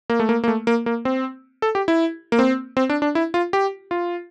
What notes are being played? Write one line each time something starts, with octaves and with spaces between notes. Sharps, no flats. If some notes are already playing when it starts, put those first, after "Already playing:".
A#3
A3
A#3
A#3
A3
A#3
A#3
C4
A4
G4
E4
A#3
C4
C4
D4
D4
E4
F4
G4
F4